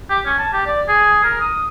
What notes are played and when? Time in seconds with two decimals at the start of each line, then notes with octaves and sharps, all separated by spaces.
0.10 G4
0.26 C#4
0.38 A5
0.53 G4
0.66 D5
0.88 G#4
1.24 A#4
1.40 D#6